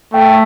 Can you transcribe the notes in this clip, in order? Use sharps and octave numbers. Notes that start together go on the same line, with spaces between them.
A3 G5